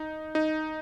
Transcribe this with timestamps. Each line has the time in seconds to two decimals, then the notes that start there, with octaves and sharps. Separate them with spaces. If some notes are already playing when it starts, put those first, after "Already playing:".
Already playing: D#4
0.35 D#4